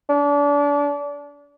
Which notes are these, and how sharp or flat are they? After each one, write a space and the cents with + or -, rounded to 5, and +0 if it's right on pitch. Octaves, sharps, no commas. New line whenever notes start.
D4 -30